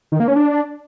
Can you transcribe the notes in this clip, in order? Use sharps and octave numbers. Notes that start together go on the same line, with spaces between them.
D#3
A#3
C#4
D4